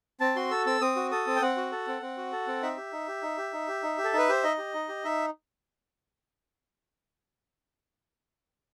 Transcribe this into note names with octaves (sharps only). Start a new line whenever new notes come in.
C4 A5
F#4 C6
A4 E6
C4 E6
C4 D#6
F#4
A4 D#6
C4
G5
C4 F#5
F#4
A4
C4
C4
F#4
A4
C4
D#4 E5
G4
D#4
G4
D#4
G4
D#4
G4
D#4
G4
A4
D#4 B4
G4 C5
D#4 D#5
G4
D#4
G4
D#4 E5